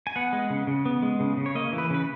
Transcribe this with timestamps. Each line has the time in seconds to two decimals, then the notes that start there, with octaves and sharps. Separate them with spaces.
0.07 G#5
0.16 B3 F#5
0.33 G#3
0.50 C#3
0.67 C#3
0.86 B3
1.02 G#3
1.20 C#3
1.37 C#3
1.46 C#5
1.55 A#3 D#5
1.73 E3
1.78 B4
1.90 C#3 B4